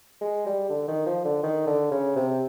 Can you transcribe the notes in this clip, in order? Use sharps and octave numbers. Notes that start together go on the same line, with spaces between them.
G#3
G3
D3
D#3
F3
D3
D#3
D3
C#3
C3